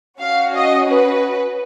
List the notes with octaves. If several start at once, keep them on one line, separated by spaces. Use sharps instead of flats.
C#4 F#4 F5
D#5
B4